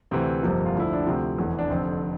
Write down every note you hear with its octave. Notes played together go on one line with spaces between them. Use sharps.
D2 C3 E3 C4
G1 F2 C3 F3 A#3
F4
D2 D3 F3 E4
D4
D2 C3 F3 C4
F1 E2 E3
D4
F1 F2 D3 C4